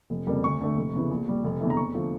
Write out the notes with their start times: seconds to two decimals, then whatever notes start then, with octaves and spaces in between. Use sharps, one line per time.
0.10 F1
0.27 F2 C#3 G3 A#3
0.43 D2 C#6
0.61 D3 A3
0.77 F1
0.94 E2 C#3 E3
1.11 A#1
1.27 A#2 G3
1.44 F1
1.60 E2 D3 A3 E4
1.70 A#5
1.77 E2 C#6
1.94 D3 F3 A3